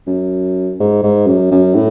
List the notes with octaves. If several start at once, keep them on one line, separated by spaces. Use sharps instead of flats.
F#2
G#2
G#2
F#2
F#2
A2